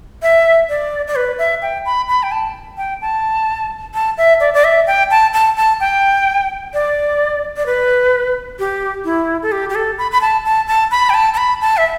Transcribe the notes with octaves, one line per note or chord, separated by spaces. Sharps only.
E5
D5
D5
B4
E5
G5
B5
B5
G5
A5
G5
A5
A5
E5
D5
D5
E5
G5
A5
A5
A5
G5
D5
D5
B4
G4
E4
A4
G4
G4
A4
B5
B5
A5
A5
A5
B5
G5
A5
A5
B5
A5
E5